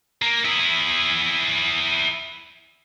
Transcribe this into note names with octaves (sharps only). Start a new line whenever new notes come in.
A#3
E4 G#4